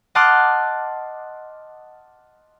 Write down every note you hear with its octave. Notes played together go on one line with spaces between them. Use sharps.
D#5 F#5 A5 C6 D6 F6